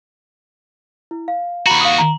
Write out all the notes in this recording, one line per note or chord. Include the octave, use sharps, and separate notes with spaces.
E4
F5
D#2 F#4 A#5 B5
F5 D#6
A#5